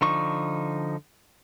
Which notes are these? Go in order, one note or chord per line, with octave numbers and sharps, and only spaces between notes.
D3 F3 D#4 C#6